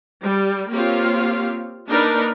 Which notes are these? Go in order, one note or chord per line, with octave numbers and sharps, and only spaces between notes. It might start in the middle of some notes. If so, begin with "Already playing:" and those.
G3
A#3 C4 F4 G4 C#5 F5
A#3 D4 D#4 A#4 B4